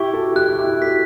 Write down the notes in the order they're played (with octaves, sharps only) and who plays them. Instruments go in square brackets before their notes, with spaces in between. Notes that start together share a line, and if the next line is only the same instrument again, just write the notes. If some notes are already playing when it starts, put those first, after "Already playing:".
Already playing: [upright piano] E4 G4 [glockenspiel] C#6
[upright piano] F#4 A4
[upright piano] E4 G4 [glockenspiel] F#6
[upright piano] E4 G4
[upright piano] F#4 A4 [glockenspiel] B6